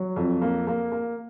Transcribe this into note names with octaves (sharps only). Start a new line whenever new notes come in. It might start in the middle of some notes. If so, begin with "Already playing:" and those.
Already playing: F#3
F2
A#3
A#3
A#3